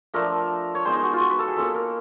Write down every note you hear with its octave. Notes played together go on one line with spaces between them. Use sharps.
F3 A3 D4 A#4
C#5
G#3 B3 D#4 C5
F#4
F4
F#4
B4
A4
G#4
A#3 C#4 F4 A4
A#4